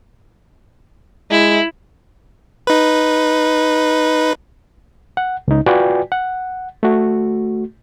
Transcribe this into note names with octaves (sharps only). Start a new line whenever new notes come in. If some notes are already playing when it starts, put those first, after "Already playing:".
G#3 E4
D#4 B4
F#5
C#2 D#4
F4 F#4 B4 D5 G5 G#5
F#5
A3 F#4